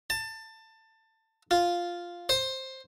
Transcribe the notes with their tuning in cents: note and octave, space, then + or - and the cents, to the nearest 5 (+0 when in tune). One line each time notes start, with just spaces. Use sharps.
A5 +20
F4 +0
C5 +10